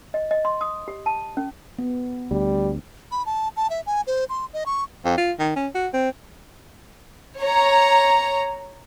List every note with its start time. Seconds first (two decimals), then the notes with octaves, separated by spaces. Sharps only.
0.14 D#5
0.31 D#5
0.45 C6
0.61 D#6
0.88 G4
1.06 A5
1.37 C#4
1.79 B3
2.31 D2 G3
3.11 B5
3.26 A5
3.56 A5
3.70 E5
3.86 G#5
4.07 C5
4.29 C6
4.53 D#5
4.66 C#6
5.05 F2
5.17 F4
5.39 D#3
5.56 C#4
5.75 F#4
5.93 C4
7.39 C#5 A#5